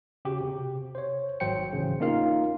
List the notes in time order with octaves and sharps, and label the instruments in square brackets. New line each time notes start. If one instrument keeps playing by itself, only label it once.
[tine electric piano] C#3 F#4 G4
C3
C5 C#5
G#1 F#3 C5 G5 C#7
A1 C#3
A#3 C#4 D#4 F4 A#4 F5